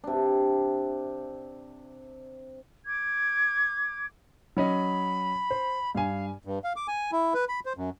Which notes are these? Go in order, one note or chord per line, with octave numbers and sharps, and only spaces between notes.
C3 D4
D6 G#6
F#3 C#4 D#5 B5
C5
G2 F5 G#5
G2
F5
D6
G#5
E4
B4
B5
C5
F#2